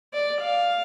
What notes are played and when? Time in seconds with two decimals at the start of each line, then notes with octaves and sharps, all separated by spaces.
0.14 D5
0.41 F5